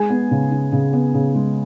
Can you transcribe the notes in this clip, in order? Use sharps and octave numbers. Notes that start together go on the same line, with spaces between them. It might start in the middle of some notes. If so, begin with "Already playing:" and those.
Already playing: G#3 G#4 G#5
B3
C#3
C#3
C#3
B3
C#3
G#3